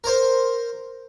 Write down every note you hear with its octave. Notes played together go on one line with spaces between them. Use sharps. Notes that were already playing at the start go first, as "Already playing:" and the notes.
A#4 C5